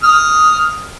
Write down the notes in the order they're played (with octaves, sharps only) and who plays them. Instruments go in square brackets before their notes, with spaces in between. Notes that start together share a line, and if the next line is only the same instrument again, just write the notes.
[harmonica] D#6 F6